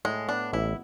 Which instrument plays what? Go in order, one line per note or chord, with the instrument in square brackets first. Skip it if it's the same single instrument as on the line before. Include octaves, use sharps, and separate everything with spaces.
[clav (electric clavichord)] A2 [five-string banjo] G#3
[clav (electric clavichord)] B3 [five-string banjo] D4
[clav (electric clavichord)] A1 [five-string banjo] E4